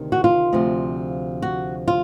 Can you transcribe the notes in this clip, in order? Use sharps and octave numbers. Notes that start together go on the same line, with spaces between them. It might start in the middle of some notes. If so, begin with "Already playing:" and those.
Already playing: D2 C3 D#3
F#4
F4
D2 C3 F3
F#4
F4